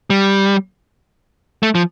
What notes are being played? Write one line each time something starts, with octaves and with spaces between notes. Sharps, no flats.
G3
A3
F3